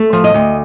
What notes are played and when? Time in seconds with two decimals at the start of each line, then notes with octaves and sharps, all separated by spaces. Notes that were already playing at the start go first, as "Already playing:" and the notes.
Already playing: A3
0.13 F3
0.24 D#5
0.34 D2